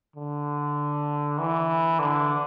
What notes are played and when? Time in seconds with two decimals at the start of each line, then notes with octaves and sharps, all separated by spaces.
0.16 D3
1.39 E3
2.00 D3